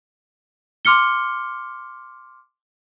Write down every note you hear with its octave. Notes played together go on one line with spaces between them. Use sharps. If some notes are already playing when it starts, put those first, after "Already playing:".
C6 D6 F6 C#7 G7